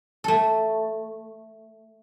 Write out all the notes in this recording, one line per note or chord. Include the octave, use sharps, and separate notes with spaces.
A3 A4